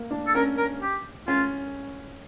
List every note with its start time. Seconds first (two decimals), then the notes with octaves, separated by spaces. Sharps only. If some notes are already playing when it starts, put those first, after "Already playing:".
Already playing: A#3
0.11 D4
0.27 A4
0.35 C#4 A#4
0.57 A#4
0.81 G4
1.27 C#4 F4